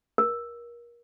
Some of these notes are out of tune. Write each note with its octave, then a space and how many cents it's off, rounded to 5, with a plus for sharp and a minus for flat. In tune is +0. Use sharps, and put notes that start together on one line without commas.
A#4 +30